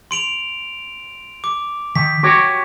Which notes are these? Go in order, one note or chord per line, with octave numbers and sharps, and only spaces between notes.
C6 D7 F7
D6
D#3 B6
F#4 G4 C#5